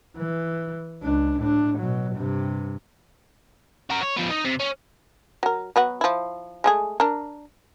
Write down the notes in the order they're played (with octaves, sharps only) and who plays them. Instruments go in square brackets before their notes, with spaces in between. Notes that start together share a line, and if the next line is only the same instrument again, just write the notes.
[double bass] E3
C#2 D4
A2 D4
B2 F#3
G2 C3
[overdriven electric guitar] F#4 A#4
C#5
F3 B3
D#4
C3
C#4
[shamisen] F#3 A#4
F#3 B3 F#4
F3 E4
G#3 A3 G#4
D4 A#4